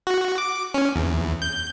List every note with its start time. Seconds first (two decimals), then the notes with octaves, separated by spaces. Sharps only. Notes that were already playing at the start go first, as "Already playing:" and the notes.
0.07 F#4
0.38 D6
0.74 C#4
0.96 E2
1.42 G6